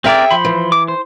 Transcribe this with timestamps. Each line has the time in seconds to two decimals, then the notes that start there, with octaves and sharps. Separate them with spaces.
0.04 C4 G#4 A#4 D5 E5 G5
0.31 F3 C5 B5
0.45 E3
0.72 D6
0.88 C5